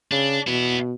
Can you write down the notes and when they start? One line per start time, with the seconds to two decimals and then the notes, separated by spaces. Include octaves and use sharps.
0.11 C#3 D4
0.47 B2 B3 E4